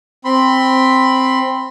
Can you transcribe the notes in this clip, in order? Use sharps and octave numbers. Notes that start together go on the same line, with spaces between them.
C4 B5 C6